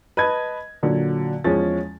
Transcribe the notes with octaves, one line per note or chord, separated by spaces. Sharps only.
B4 D#5 A5 G#6
A#2 D3 F#3
E2 F3 G#3 C#4 A6